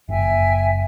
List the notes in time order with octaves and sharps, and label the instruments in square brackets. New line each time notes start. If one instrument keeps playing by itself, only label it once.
[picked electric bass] F#1 [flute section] E5 G5 G#5